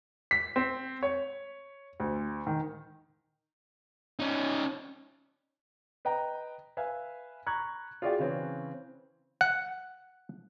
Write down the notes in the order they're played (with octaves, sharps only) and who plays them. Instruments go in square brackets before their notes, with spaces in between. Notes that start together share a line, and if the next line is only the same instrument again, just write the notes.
[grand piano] B6
C4
C#5
D2
D#3
[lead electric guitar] C#4 D#4
[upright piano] B4 D#5 G5 A#5
B4 E5 F5 G#5
A#5 B5 C#6 F#6 G#6
F4 F#4 G#4 D5 E5 G5
C#3 E3 C4 C#4 B4
[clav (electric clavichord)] F#5